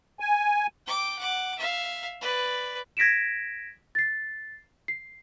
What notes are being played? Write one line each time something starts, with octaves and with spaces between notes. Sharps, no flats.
G#5
G5 D6
F#5 D6
E5 F5
B4 D5
G#6 A#6 B6 D7 E7
A6 C7
C7